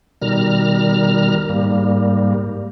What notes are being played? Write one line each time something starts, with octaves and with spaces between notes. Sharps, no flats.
B2 D#3 G3 A#5 F6
G#2 G3 A#3